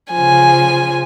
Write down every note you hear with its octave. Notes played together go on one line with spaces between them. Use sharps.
C#3 F3 G#5